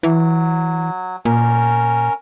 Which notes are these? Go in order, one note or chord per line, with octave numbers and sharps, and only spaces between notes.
E3 F#3
A#2 C#4 A#4